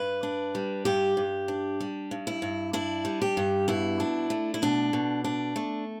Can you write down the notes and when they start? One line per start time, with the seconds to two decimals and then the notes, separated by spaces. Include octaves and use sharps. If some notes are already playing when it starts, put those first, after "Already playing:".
Already playing: G2 B4
0.23 D4
0.55 G3
0.85 G2 G4
1.17 G2
1.48 D4
1.80 G3
2.11 G2
2.27 E4
2.42 G2
2.73 D4 E4
3.05 G3
3.22 G4
3.37 G2
3.68 B2 E4
4.00 D4
4.30 A3
4.54 E4
4.62 B2 D4
4.93 B2
5.24 D4
5.56 A3